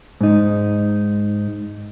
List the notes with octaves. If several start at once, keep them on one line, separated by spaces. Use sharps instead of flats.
G#2 D#4